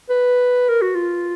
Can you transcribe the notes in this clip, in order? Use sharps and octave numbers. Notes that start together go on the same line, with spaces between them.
B4
A#4
F#4
F4